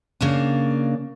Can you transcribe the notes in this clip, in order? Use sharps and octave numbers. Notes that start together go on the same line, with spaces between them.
C#3 A#3 D4